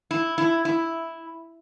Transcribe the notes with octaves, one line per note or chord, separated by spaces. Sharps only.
E4
E4
E4